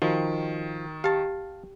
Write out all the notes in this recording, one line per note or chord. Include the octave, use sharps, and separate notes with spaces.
D#3 F3 F#4
G4 F5 G5 A5